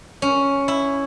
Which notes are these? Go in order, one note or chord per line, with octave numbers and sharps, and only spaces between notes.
C#4
E4